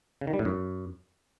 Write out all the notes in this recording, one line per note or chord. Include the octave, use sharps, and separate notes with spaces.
C#3
D#3
G3
A2
F#2